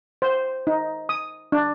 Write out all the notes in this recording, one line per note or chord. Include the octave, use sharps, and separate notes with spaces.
C5
D#4
D#6
D4